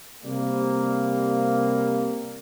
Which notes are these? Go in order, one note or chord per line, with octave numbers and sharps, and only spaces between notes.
C3 G3 A#3